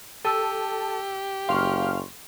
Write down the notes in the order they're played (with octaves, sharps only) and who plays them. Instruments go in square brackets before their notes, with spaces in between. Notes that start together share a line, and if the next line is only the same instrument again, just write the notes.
[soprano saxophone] G4 [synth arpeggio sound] A4 [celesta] E6 D#7
[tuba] F#1 [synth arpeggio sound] F5 F6 [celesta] C6 C#6